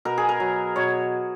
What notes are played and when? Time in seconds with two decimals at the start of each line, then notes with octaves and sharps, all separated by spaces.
0.05 B2 A#4
0.18 G#4
0.29 A#4
0.40 F#3
0.76 B2 C#5